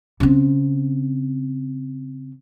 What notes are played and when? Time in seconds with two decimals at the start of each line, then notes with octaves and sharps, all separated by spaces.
0.20 C#3 C4